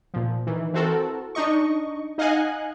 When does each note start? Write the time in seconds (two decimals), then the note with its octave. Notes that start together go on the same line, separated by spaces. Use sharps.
0.14 A#2 F3
0.47 D#3 E3
0.73 E3 C4 F#4 A4 A#4
1.35 D4 D#4 D#5 C#6
2.18 D#4 D#5 F5 F#5 G#5 F#6